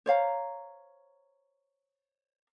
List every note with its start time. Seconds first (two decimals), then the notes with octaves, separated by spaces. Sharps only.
0.06 C5 C#5 F5 A#5